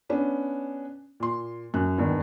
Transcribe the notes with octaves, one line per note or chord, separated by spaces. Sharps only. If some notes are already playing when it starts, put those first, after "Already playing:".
B3 C#4 D4
A#2 C6
F#2 F#6
E2 G2 D#3